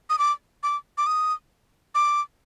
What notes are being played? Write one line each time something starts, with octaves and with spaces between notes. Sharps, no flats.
D#6
D6
D6
D6
D#6
D6